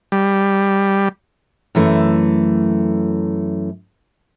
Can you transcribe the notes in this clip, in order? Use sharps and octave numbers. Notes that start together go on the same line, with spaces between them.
G3
F#2 E3 A3